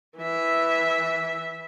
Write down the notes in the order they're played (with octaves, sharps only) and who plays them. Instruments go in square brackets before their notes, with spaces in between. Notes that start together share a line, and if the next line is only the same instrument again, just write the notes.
[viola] E3 E5